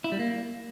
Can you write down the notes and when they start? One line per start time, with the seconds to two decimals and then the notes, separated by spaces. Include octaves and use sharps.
0.04 E4
0.12 G3
0.19 A#3